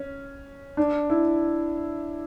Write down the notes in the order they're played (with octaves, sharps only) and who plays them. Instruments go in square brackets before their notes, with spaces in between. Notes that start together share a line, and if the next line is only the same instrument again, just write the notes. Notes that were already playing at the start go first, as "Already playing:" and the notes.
Already playing: [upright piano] C#4
D4
E4